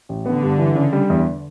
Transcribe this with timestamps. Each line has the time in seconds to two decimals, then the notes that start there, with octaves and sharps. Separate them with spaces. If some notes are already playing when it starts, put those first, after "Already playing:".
0.09 A1
0.26 D3 B3
0.43 G2
0.59 E3
0.75 C#3
0.93 G3
1.10 E2